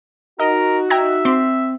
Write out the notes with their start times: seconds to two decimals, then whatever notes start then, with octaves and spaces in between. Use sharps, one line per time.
0.40 D#4 F#4 A#4 D#5
0.90 E5 G5 A#5 G#6
1.25 C4 C6 D6 B6